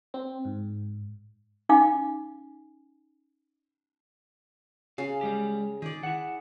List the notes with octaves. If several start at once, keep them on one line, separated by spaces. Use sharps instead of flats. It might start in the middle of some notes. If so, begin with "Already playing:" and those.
C4
G#2
C#4 D#4 F5 G#5 D6
C#3 F5
G3 G#3 G4
D#3 G#4 D5
E4 F#5